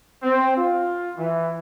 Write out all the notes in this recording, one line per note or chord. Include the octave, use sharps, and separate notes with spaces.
C4
F4
E3